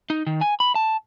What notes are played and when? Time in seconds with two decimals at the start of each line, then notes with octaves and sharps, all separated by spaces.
0.10 D#4
0.27 D#3
0.41 G#5
0.60 B5
0.75 A5